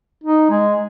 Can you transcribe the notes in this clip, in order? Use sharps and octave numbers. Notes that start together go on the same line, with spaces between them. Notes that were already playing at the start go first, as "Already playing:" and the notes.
D#4
G#3